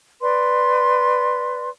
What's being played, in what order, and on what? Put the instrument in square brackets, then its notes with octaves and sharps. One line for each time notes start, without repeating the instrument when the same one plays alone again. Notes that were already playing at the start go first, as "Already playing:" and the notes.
[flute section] B4 D5 C6